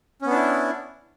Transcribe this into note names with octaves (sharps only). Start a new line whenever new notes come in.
B3 C#4 D4 E4